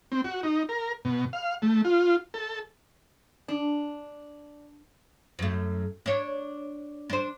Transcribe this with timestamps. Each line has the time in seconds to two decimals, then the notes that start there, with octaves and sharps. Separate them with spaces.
0.12 C4
0.24 F#4
0.43 D#4
0.69 A#4
1.05 B2
1.33 F5
1.62 A3
1.84 F4
2.34 A4
3.48 D4
5.39 F#2 A3
6.06 D4 C#5
7.10 D4 C5